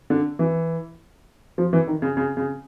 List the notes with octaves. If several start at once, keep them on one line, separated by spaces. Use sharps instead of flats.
D3
E3
F3
E3
D#3
C#3
C#3
C#3